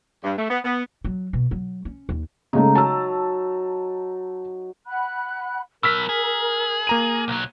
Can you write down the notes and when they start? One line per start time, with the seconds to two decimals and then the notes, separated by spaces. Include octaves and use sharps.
0.24 G2
0.38 A3
0.50 B3
0.65 B3
1.05 F#3
1.33 B2
1.51 F#3
1.85 C#4
2.09 D#2
2.53 C#3 G#3 A3 D#4
2.75 F#3 A5 E6
4.87 F#5 B5 F#6
5.83 B2 F#3 A#4 E6 F6 B6
6.09 G#4
6.87 A#3 A#5 D#7
7.28 B1 F#3